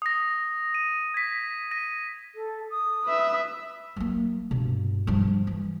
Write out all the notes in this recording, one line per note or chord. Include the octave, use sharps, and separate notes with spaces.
D#6 A#6
D#7
G#6 B6
A#6 D#7
A4
D#6
B4 E5
F#3 A#3
G2 B2
G2 F3
E3